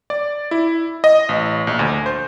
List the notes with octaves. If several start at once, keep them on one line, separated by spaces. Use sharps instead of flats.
D5
E4
D#5
A1
A#1
D2
C5